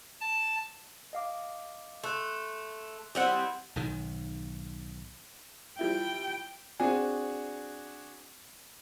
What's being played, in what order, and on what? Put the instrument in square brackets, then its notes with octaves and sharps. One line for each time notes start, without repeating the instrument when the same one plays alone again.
[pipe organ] A5
[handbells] D#5 F5 D6
[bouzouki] A3 [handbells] C6 F#6
[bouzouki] G3 C4 E4 [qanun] D#5 F#5
[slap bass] B1 G#2 D#3
[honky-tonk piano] F3 G3 E4 [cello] G5
[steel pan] C4 G#5 [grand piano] D4 F#4 G#4